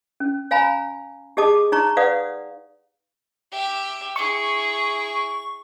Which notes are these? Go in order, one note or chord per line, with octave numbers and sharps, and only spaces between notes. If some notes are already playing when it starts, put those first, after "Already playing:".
C#4
C#5 F5 G#5 A#5 B5
G4 G#4 D#5 A5 D6 D#6
D#4 C#5 A#5 C#6
B4 C#5 D5 F5 F#5 D#6
G4 E5
E4 G#4 C#6